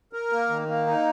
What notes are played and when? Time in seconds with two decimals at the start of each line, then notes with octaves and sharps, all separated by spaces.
0.13 A#4
0.32 A#3
0.49 D#3
0.68 A#3
0.87 D#4